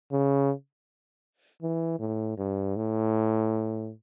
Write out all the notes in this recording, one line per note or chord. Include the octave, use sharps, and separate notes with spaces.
C#3
E3
A2
G2
A2